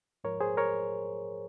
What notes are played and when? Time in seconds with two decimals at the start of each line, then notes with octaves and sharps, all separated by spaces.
0.24 G#2 F3 A#4 C#5
0.41 G#4 C5
0.57 A#4 C#5